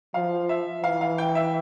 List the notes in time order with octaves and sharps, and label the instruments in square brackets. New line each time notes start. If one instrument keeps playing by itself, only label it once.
[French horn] F3 [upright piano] F5
[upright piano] E5
[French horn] E3 [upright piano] F5
[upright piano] F5
G5
E5